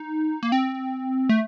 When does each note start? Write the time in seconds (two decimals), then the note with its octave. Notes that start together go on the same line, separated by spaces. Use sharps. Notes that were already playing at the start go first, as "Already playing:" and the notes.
Already playing: D#4
0.43 A#3
0.52 C4
1.29 A3